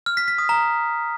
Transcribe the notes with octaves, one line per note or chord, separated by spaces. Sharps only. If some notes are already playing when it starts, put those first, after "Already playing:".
F6
B6
B6
D#6
A#5